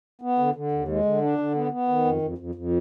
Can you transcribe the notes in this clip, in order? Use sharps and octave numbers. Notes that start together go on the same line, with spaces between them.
B3
D3
D3
D#2
G#3
D3
D4
D3
B3
B3
D#3
F2
F2
F2
F2